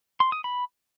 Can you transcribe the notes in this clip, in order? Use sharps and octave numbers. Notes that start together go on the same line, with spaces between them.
C6
D#6
B5